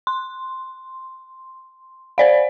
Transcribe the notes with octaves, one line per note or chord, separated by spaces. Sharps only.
C6
C5 D5 F5